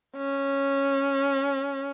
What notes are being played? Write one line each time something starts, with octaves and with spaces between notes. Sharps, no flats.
C#4